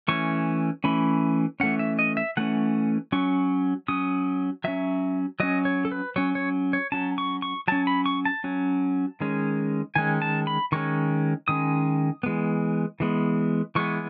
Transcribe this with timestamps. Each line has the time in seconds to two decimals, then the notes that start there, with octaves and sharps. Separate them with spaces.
0.08 E3 A3 C#4 C#6
0.84 E3 A3 C#4 B5
1.60 E3 A3 C#4 F#5
1.79 E5
1.99 D#5
2.17 E5
2.37 E3 A3 C#4 F#5
3.12 F#3 C#4 C#6
3.88 F#3 C#4 D#6
4.64 F#3 C#4 E5
5.40 F#3 C#4 D#5
5.65 C#5
5.85 A4
5.92 B4
6.16 F#3 C#4 C#5
6.35 C#5
6.73 C#5
6.92 F#3 C#4 A5
7.18 C#6
7.42 C#6
7.68 F#3 C#4 A5
7.87 B5
8.06 C#6
8.25 A5
8.44 F#3 C#4
9.20 D#3 G#3 C#4
9.95 D#3 G#3 C#4 G#5
10.22 A5
10.47 B5
10.72 D#3 G#3 C#4 C#6
11.48 D#3 G#3 C#4 D#6
12.23 E3 G#3 B3
13.00 E3 G#3 B3
13.75 E3 G#3 B3 C#6